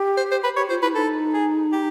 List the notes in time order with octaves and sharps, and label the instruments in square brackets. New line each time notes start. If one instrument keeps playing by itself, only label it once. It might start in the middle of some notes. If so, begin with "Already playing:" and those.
Already playing: [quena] G4
[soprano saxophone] C5
C5
B4
[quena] G4 [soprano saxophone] C#5
[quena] F4 [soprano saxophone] C5
[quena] E4 [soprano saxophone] B4
[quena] D#4 [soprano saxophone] A4
[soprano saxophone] G#4
G4